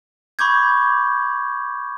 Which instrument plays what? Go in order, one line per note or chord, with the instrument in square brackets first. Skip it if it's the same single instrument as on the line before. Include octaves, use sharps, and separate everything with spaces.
[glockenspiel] B5 C#6 D6 G6 G#6